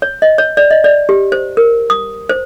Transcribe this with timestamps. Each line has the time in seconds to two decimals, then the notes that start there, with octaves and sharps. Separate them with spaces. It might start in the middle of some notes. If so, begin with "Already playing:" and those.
0.02 C#5
0.22 D#5
0.38 C#5
0.57 D5
0.71 D#5
0.84 D5
1.09 G4
1.32 C5
1.57 A#4
1.90 D#6
2.29 C5